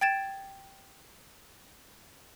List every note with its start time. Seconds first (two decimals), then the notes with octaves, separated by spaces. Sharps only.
0.01 G5 G#6 A6 D7 E7